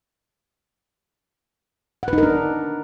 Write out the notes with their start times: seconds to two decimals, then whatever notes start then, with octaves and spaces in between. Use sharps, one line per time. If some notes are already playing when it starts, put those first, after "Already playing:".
2.03 F#5
2.08 B4
2.13 D#4
2.18 A#4
2.23 D4